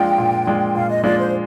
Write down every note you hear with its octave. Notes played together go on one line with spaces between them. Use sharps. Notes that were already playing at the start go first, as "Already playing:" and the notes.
Already playing: F3 G#3 D4 F4 G5
A#2
F3 G#3 D4 F4
A#2 F5
D#5
F3 G#3 D4 F4 D5
C5